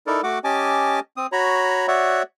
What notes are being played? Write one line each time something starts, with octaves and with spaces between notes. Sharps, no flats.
D#4 E4 A4 A#4 D5
A3 F#4 F#5 D6
C#4 G4 D#5 G#5 A5 D6
C4 D#6
F#4 C#5 A#5 B5
F#4 C#5 D5 E5 F#5